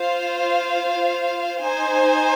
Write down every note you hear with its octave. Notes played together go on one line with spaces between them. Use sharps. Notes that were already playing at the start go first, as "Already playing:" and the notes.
Already playing: F4 C5 F5
D#4 C5 G#5